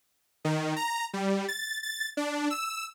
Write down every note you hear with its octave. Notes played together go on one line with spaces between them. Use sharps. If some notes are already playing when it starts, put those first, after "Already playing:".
D#3
A#5
G3
A6
A6
D4
E6